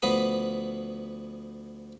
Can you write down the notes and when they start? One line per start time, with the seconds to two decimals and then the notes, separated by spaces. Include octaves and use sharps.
0.02 D2 F3 B3 B4 B5 D#6